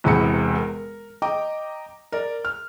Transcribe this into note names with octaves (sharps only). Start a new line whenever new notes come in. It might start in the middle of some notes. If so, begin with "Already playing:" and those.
E1 E2 C3 A#5 B5 C#7
A#4
D#5 G5 A#5 D6
A#4 D5
F6